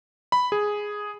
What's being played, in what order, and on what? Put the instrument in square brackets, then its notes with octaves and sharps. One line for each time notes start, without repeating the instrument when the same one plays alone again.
[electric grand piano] B5
G#4